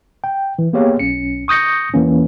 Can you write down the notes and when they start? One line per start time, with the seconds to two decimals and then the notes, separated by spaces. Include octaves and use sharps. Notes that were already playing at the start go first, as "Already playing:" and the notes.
0.24 G5
0.59 E3
0.73 A#3 B3 G4 G#4 C#5 F5
0.99 B1 C#4 C#7
1.48 C#6 D#6 G6 A#6 C#7
1.94 E2 E3 A#3 C#4